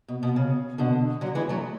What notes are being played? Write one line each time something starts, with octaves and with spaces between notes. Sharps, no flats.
B2
B2
C#3
B2 D3
D3 F#3
E3 G#3
F#3 A3